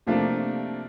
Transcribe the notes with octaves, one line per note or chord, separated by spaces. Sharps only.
C3 F3 A3 A#3 D4